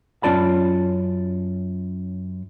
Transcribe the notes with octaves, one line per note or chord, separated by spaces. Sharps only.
F#2 C#4 F4 D5 A5 B5